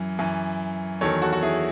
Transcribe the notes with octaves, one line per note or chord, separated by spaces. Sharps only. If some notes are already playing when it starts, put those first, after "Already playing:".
Already playing: F#2 E3
F#2 E3
E2 D#3 F#3 A4 C#5
F#4 A4
F#4
E4 G#4